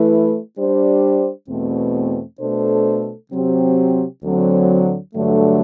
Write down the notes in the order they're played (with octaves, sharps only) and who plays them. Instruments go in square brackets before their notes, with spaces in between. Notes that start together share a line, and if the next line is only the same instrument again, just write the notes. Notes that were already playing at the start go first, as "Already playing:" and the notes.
Already playing: [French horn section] E3 A3 E4 B4
G3 D4 G4 C5
E2 B2 A3 C4
B2 A3 D4 A4 C5
C3 F#3 C4 G4
D2 D3 F#3 C4
G2 D3 F#3 A3